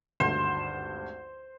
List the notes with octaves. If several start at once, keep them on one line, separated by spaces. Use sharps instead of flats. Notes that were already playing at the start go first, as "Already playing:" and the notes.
G#1 D2 G2 C5